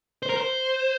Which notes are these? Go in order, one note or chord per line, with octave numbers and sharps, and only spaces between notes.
C5
A#4
C5